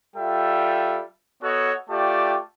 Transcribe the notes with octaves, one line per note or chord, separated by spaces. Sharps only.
G3 F4 A4 E5 G5
B3 F#4 A4 C#5 D#5 F#5
A3 F4 G4 D5 G5 A5